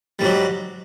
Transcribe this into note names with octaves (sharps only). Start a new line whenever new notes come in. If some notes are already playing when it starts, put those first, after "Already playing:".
G#2 F#3 G3